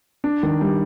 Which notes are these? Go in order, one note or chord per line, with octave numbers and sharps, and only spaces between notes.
D4
D#3
G3